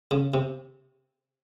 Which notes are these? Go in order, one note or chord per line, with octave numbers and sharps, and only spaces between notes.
C#3
C3